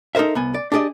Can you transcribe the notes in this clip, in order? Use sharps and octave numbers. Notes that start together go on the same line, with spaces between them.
D#4 A4 A#4 C5 E5
C2 B3 G#5
D5
D4 G4 G#4 D5 D#5